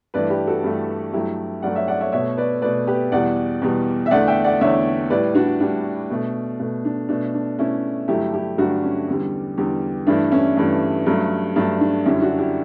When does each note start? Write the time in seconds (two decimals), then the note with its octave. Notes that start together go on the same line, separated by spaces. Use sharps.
0.14 G2 E3 A3 B4 D5
0.30 G4 B4
0.47 F#4 A4
0.64 G2 E3 A3
1.13 G2 F#3 A3 E4 G4
1.62 G2 F#3 A3 D5 F#5
1.76 C#5 E5
1.88 D5 F#5
2.00 C#5 E5
2.12 B2 A3 C#5 E5
2.37 B4 D5
2.62 B2 A3 B4 D5
2.87 G4 B4
3.12 E2 B2 G3 D5 F#5
3.62 E2 B2 G3
4.06 E5
4.11 E2 D3 A3 D5 F#5
4.28 E5 G5
4.44 D5 F#5
4.61 E2 D3 A3 C#5 E5
5.10 A2 G3 B4 D5
5.35 D4 F#4
5.60 A2 G3 D4
6.10 B2 A3
6.60 B2 A3
6.85 D4
7.09 B2 A3 D4
7.34 D4
7.59 B2 A3 C#4 E4
8.08 G2 D3 F#3 A3 E4 G4
8.34 E4 G4
8.58 G2 D3 F#3 A3 D4 F#4
8.83 C#4
9.08 E2 D3 G3
9.57 E2 D3 G3
10.07 G2 E3 A3 D4
10.32 C#4 E4
10.57 G2 E3 A3
11.06 G2 F#3 A3
11.56 G2 F#3 A3 D4
11.81 D4
12.06 F#2 D3 G3 C#4 E4
12.22 D4 F#4
12.38 E4 G4